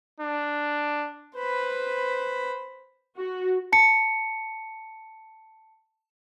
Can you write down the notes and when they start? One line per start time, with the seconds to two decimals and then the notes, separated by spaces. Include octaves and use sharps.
0.20 D4
1.36 B4 C5 B5
3.17 F#4
3.72 A5 C#7